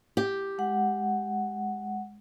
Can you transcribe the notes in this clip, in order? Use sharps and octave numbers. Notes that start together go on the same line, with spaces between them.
G4
G#3 F#5